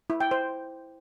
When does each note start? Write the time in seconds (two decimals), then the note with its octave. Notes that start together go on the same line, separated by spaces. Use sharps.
0.10 E4
0.20 G5
0.31 C5